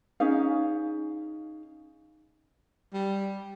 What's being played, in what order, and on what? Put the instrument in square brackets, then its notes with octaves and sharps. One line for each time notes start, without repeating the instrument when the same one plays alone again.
[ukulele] C#4 D#4 G#4 F5
[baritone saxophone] G3